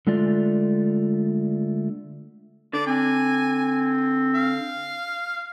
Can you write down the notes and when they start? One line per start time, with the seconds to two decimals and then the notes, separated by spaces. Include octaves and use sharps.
0.07 D3 G#3 A3 F4 D5
2.73 D3 D5
2.87 C4 G#5
4.35 F5